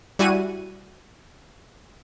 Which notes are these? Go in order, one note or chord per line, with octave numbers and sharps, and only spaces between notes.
G3 E4 F#4 G#5 D#7